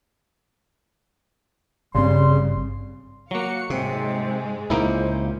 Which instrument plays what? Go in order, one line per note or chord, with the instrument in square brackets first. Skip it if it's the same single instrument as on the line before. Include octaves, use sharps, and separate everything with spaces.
[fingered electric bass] G#1 G2 C4 [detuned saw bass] C#3 [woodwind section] G3 C6
[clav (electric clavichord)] F#3 A#3 [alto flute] F#4 [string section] F5 C#7
[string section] G#2 G#3 [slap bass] C3 [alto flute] C4
[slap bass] C#2 A#2 C#3 [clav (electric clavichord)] A#3 D#4 E4 [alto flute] C5